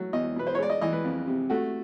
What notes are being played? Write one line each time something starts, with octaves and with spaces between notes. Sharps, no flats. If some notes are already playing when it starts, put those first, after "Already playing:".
Already playing: F#3 A3
E2 D#5
B2 B4
C5
C#5
G#3 D5
D#5
E3 D#5
B4
F2
C3
A3 F#4